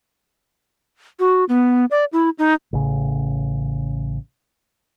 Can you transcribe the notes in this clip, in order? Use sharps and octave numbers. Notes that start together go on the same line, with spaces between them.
F#4
B3
D5
E4
D#4
A1 C#3